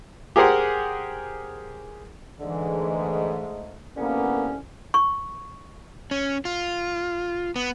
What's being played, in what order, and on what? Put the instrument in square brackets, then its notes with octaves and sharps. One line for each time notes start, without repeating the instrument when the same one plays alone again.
[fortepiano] G4 G#4 A#4 C5 F#5 G#5
[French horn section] G#2 G#3 A3 [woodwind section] D3 E3
[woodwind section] C2 D3 C#4 [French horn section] A#3 B3
[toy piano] C#6
[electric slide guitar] C#4
F4
B3